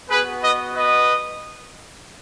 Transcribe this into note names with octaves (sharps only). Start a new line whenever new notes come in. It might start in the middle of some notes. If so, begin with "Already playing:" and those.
B3 F#4 G#4 B4
B4 D#5
B4 D#5